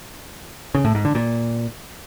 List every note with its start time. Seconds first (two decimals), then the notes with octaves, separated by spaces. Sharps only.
0.75 C#3
0.85 A2
0.95 G#2
1.05 D3
1.15 A#2